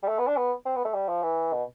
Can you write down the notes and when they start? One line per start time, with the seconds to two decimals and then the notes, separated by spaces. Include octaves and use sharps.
0.03 G3
0.08 A3
0.19 B3
0.27 D4
0.37 B3
0.66 C4
0.76 B3
0.85 A3
0.95 G3
1.09 F3
1.23 E3
1.53 B2